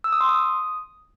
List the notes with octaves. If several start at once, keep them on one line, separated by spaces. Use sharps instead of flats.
E6
D#6
C6
D#6